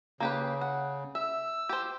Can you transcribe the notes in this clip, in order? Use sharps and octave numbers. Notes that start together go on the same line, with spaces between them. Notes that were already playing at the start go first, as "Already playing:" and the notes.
C#3 A#3 G4 B4
F#5
E5 E6
G4 C5